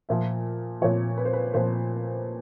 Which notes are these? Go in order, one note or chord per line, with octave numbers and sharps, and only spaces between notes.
A#2 F3 E5
A#2 F3 C#5
B4
C5
B4
A#2 F3 C5